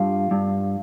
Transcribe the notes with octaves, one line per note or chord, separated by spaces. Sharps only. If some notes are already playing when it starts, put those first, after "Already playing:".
Already playing: G2 F4
G2